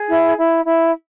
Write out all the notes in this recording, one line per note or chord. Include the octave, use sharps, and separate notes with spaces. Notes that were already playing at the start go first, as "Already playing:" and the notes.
Already playing: G#4
E4
E4
E4